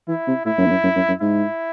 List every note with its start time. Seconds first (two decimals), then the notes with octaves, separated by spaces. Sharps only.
0.08 E3 E4
0.27 C3
0.45 A2 E4
0.58 F#2
0.66 E2
0.70 F#2
0.84 F#2
0.96 F#2
1.08 F#2
1.21 G#2 E4